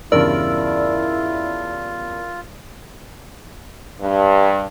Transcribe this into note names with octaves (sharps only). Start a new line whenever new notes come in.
E2 G2 C#3 E4 F4 A#4 D5 E6
G2